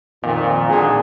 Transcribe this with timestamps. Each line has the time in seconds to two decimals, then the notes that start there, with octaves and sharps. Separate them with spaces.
0.23 F2 A#2 D#3
0.68 G#1 A#2 D3 G#4